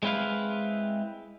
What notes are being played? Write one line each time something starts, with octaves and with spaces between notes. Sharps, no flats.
G#3 C4 E4 B4 F5